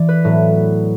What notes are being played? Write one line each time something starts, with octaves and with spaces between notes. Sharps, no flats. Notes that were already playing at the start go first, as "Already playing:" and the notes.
Already playing: E3 D5
B4
A2 F#3 B3